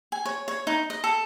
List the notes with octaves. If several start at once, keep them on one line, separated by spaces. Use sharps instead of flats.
G#5
C#5
C#5
D#4
D#5
A4